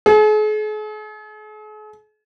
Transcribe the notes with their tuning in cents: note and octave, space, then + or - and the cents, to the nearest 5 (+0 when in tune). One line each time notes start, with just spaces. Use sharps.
G#4 +45